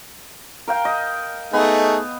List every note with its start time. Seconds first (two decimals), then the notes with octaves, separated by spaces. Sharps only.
0.68 A#4 F5 G5
0.85 D#5
1.53 A3 B3 D#4 G#4